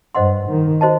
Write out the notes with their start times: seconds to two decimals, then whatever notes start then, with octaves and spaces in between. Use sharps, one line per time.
0.15 G2 C5 D#5 F#5 C6
0.48 D#3
0.81 F#4 C5 D#5 A5